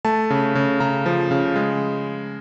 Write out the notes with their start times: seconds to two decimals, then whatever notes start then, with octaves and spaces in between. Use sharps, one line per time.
0.05 A3 A5
0.30 C#3
0.55 C#3
0.80 C#3 A#5
1.06 F3
1.31 C#3
1.56 G#3